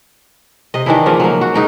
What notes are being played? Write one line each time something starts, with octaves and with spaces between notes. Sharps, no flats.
C3 D#5
D#3 E3 D4 E4
C#3 F3 A#3 D#5
F#3 A#3
F#4
G#2 D#4 G5